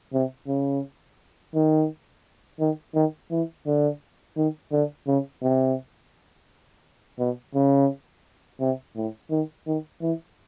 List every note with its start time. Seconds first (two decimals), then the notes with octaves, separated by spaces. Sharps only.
0.13 C3
0.48 C#3
1.54 D#3
2.60 D#3
2.95 D#3
3.31 E3
3.67 D3
4.37 D#3
4.72 D3
5.07 C#3
5.42 C3
7.19 B2
7.55 C#3
8.61 C3
8.96 A2
9.31 D#3
9.67 D#3
10.01 E3